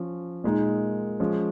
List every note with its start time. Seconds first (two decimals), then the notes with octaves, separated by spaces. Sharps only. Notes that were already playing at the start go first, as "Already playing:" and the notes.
Already playing: F3 C#4
0.44 A#2 G#3 D#4
1.20 F3 G#3 C#4